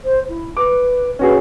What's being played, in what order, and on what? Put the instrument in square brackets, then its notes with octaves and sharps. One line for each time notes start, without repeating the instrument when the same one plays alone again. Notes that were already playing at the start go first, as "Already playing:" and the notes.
[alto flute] C5
E4
[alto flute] B4 [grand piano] D6
[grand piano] C#4 F#4 G#4 [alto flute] B4